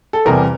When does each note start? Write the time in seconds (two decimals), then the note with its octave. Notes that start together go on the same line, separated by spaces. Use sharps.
0.13 A4
0.25 E2 C3 E3 G3 A#4